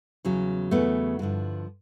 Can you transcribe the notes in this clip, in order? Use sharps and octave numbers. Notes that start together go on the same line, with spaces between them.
E2 C#3 F#3
E2 C#3 F#3 A3 B3
G2 D3 F3